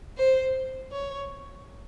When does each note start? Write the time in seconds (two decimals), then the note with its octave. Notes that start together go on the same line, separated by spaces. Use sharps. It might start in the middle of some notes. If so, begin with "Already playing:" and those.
0.17 C5
0.92 C#5